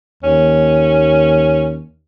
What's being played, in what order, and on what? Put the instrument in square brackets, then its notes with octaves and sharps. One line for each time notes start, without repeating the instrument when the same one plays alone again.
[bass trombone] D#2 [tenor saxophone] C#4